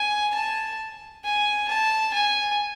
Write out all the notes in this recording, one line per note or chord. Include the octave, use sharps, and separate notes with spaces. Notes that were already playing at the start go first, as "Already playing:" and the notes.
Already playing: G#5
A5
G#5
A5
G#5